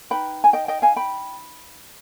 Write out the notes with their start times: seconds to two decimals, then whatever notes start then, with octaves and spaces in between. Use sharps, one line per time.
0.10 D#4 B4 G5 B5
0.44 G#5
0.53 D#5 G5
0.68 D#5 G5
0.82 F5 G#5
0.96 G5 B5